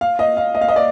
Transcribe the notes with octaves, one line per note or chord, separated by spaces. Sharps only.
F5
D#5
F5
D#5
F5
D#5
D5